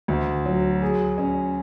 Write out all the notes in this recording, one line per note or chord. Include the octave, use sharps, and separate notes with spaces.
D2
F#3
G#4
C#4